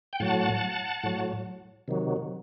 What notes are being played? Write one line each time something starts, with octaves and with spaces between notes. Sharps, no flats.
G5
A2 F#3 F#5 A5
A2 F#3
C3 D#3 F#3